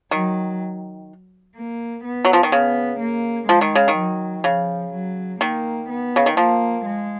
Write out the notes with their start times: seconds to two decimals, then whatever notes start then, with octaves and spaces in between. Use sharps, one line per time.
0.11 D#3 F#3
1.56 A#3
2.04 B3
2.25 F#3
2.33 F3
2.43 D#3
2.52 C#3 B3
3.00 A#3
3.48 F3 G#3
3.61 D#3
3.75 C#3
3.88 D#3
3.97 F#3
4.44 C#3 F3
4.93 F#3
5.40 D#3 A#3
5.89 B3
6.16 C#3
6.26 D#3
6.37 F3 A#3
6.85 G#3